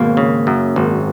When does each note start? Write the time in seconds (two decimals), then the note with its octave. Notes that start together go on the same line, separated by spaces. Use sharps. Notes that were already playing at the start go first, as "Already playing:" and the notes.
Already playing: G#1 B2 A#3
0.17 C#3
0.47 F#2
0.76 G#1